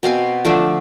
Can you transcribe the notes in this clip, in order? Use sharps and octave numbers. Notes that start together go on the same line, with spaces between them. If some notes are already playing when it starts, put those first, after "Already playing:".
B2 C4 F5 G#5
D3 F3 A3 D4